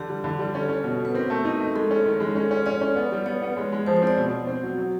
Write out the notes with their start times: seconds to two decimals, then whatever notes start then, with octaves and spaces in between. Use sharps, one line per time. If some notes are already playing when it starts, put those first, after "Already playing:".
Already playing: D3 G4
0.09 G3
0.24 D3
0.39 G3
0.54 C#4 A4
0.69 C#4
0.84 B2
0.99 B2
1.05 B4
1.14 C4 A#4
1.30 A3
1.45 D#4
1.60 A3
1.75 G#3 A4
1.91 C#4
2.06 D#3
2.20 G#3
2.35 C#4
2.51 C#4
2.66 C#4 D5
2.81 C#4
2.96 B3
3.12 G3
3.26 B3 C#5
3.42 B3
3.57 G#3
3.73 G#3
3.86 F3 C5
3.97 C5
4.02 C4
4.07 D5
4.17 B2
4.32 B2
4.47 C4
4.63 F#3
4.78 F#3